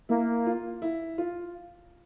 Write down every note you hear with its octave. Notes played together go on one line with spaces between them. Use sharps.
A#3 E4
F4
E4
F4